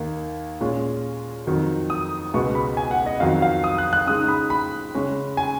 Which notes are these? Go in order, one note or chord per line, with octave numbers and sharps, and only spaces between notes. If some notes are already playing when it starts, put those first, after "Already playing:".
Already playing: D#2 D#3 A#3
A#2 G#3 C#4 F4
F2 D#3 F#3
D#6
C#2 B2 G#3 B3 C#6
B5
G#5
F#5
D#5
F2 D#3 F#3 F5
F5
D#6
F#6
F#6
C#3 G#3 D#4 D#6
B5
B5
C#3 G#3 C#4
G#5